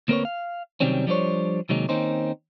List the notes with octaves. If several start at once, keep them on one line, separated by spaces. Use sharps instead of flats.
D2 A#3 C4 A#4 B4 C#5
F5
C3 D#3 F#3 G3 C4 C#4
F3 G3 D4 F4 C5 C#5
C3 D#3 F#3 G#3 A#3
D#3 A#3 C4 C#4 D#4 C5